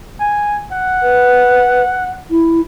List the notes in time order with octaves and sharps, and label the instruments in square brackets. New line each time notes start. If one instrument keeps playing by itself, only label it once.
[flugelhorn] G#5
F#5
[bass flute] B4
E4